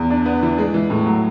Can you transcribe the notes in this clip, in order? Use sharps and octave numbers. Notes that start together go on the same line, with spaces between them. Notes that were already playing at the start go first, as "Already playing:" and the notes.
Already playing: E2
D4
B3
E3
G#3
E3
A2
F#3